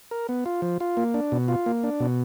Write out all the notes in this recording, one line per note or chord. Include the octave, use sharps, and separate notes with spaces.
A#4
B3
F4
F3
F4
A#3
D4
B2
F4
A#3
D4
B2